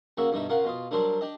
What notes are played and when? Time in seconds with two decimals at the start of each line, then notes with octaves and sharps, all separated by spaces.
0.17 C#3 A#3 F#4 E5
0.32 G2 B2 D3 D#4 E5
0.49 C#3 F4 A#4 F#5
0.64 B2 F4 D#6
0.91 D3 F#3 G3 D4 A#4 C5
1.21 D4 G4 D#5